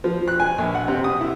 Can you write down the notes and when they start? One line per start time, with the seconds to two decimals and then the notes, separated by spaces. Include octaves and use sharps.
0.04 F3
0.28 F#6
0.40 G#5
0.58 A#1
0.75 F#5
0.88 C3
1.04 D#6
1.21 E4